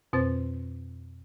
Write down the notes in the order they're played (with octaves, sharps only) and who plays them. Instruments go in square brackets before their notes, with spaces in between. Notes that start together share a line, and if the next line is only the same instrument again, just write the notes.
[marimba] F2 B2 C4 C5 A6